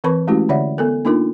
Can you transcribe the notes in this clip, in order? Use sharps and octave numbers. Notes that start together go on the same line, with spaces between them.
E3 C4 A#4 B4 B5 C#6
G#3 A3 C#4 E4 F#4 G4
D3 C#5 D5 E5 F#5
B3 A4 A#4
A#3 D4 D#4 F4 A#4